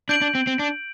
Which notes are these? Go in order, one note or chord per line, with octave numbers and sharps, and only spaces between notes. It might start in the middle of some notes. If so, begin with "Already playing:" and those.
D4 G6 D7 F#7
D4
C4
C4
D4